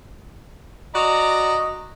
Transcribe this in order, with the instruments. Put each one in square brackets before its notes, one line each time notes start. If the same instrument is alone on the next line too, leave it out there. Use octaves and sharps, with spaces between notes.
[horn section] F#4 D5 A#5 [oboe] D#5